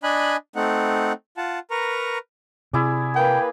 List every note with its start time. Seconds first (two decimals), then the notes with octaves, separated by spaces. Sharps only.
0.03 D4 D#5 G#5 B5 F#6
0.56 A3 C4 D#4 F#5
1.37 F4 F#5 A5
1.71 A#4 B4 A#5 C#6
2.73 C3 E4 G#4 D5
3.16 A#3 B4 G5